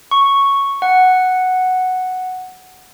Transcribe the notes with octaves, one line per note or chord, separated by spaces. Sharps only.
C#6
F#5